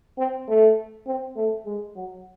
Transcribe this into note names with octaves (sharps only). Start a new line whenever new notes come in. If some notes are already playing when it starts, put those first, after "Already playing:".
C4
A3
C4
A3
G#3
F#3